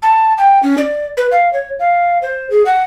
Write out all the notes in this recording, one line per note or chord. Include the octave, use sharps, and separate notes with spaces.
A5
G5
C#4
D5
B4
F5
C#5
F5
C5
G#4
F#5